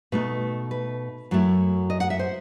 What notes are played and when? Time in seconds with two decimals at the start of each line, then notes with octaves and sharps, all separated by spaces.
0.12 B2 A3 D#4 B4
0.71 B4
1.31 F#2 F#3 A3 E4
1.90 D#5
2.00 F#5
2.10 E5
2.19 C5